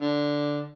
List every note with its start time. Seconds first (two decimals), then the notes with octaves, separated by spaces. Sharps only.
0.01 D3